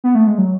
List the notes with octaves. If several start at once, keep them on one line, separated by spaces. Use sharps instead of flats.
B3
A3
G#3
F#3